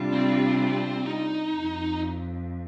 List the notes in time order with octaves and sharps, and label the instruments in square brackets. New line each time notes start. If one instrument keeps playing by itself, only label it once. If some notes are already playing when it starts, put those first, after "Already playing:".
Already playing: [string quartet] C3 G3 D4 F4
[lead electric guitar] C4
D#4
[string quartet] F2